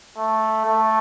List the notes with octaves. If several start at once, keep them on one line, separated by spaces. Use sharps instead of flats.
A3
A3